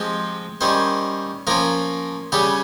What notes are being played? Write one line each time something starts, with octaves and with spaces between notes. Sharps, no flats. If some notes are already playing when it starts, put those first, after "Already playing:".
Already playing: F3 G#3 C4 G4
D#3 G3 C#4 C5
F3 A#3 C#4 A#4
C#3 G3 C#4 G4